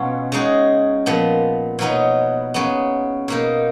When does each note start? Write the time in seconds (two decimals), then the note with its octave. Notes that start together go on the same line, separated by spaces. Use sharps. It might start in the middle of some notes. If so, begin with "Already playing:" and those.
Already playing: B2 F#3 C#4 F4
0.32 C#3 G#3 D#4 F#4
1.06 A#2 F3 B3
1.79 B2 F#3 B3 D#4
2.54 C#3 F#3 B3
3.28 B2 A#3 D#4